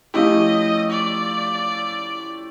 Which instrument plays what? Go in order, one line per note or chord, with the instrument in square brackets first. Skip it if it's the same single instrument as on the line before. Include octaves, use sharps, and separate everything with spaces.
[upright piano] F3 A3 C#4 E4 G4 [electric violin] D#5
[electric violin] D5